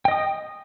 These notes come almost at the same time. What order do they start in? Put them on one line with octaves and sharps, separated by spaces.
G5 D#5 D#6